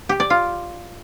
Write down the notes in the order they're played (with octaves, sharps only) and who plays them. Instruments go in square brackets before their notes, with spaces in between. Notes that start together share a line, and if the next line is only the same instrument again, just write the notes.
[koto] G4
D5
F4